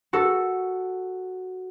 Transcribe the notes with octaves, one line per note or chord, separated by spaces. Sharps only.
F#4 A4